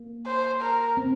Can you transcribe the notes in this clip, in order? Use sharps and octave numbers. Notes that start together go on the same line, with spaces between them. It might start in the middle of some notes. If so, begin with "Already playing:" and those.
Already playing: A#3
C5
A#4
C4